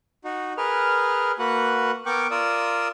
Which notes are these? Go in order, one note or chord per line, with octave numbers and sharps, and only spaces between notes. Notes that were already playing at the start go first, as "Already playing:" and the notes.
D#4 F#4
G#4 A#4 B4 F6
A#3 F#4 B4 F#5
B3 A#4 G5 C#6 D6
F4 A#4 D5 D#6 E6